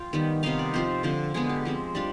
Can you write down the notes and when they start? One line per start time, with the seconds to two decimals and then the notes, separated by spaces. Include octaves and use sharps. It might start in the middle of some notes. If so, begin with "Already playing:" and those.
Already playing: F4 G5
0.13 D#3 G3 B3
0.43 C3 D#3 B3 D#4 F5
0.59 D5
0.74 F3 C4 F4 C5
1.03 D3 F3 C4
1.34 D3 G#3 B3 G#4
1.49 G4
1.65 F3 G#3 C4
1.95 G3 D4 F4